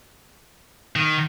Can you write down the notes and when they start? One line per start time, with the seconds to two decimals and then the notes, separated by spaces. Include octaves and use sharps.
0.96 D#3